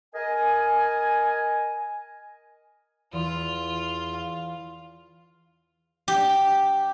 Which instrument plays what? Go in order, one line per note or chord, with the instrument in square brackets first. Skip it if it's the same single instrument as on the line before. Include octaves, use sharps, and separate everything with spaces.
[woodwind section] A#4 D#5 G#5
[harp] E2 [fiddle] F4
[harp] F5
[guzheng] G4